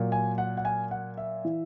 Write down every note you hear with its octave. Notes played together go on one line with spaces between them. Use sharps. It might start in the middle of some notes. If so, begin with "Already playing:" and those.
Already playing: A#2 F#3
G#5
F#5
F#5
G#5
F#5
E5
E3